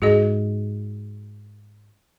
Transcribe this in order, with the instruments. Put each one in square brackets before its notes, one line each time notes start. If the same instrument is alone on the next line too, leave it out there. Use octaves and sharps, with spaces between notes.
[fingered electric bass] G#2 [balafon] F#4 G#4 D#5